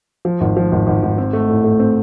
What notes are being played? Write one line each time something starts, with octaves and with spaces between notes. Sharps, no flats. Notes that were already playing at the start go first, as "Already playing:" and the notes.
F3
G#1
F3
G#1
G#1
G#1
C4
A3
A2
A3
C4